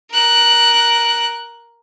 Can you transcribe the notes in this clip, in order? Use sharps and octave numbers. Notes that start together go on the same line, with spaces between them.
A#4 F#6